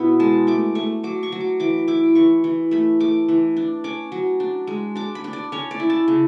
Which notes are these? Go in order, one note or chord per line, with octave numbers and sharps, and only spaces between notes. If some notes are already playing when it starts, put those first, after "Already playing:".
Already playing: B2 B3 E4 B5
G#3 A5
A3 D6
A3 C#6
F#3 D6
C#6
F#3
D6
E3 D6
E4 D6
E3 C#6
E3
A3 B5
A3 D6
E3
D4
C#4 D6
F#3
D4
G#3
D4 D6
B5
D4
D5
C#4 C#5
D5
E4
A5
C#3